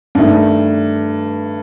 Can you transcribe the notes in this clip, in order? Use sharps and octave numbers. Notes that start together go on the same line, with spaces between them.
G2 D#3 A3